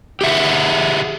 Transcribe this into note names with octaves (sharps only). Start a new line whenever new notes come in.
G4 G#4 E5 F#5